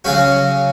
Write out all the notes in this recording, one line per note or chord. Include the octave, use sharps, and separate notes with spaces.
C#3 F#3 C#4 F#4